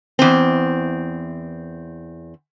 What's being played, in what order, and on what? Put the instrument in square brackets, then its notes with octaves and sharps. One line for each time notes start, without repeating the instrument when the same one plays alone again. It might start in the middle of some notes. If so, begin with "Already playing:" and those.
[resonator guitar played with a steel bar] E2 C4